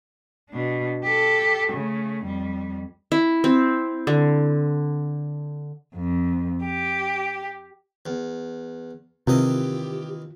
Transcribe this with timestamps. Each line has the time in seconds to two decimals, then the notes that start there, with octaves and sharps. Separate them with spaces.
0.50 B2 D4
1.04 G4 A4
1.73 C#3 A3
2.25 F2 G3
3.12 E4
3.44 C4
4.07 D3
5.96 F2
6.65 G4
8.06 E2
9.27 D#2 C3 E3 F4 G4 D#5